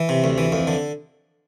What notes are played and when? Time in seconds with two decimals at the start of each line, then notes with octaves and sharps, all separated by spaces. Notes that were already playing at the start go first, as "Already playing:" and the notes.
Already playing: E3
0.09 C3
0.24 D2
0.38 E3
0.52 F2
0.67 D3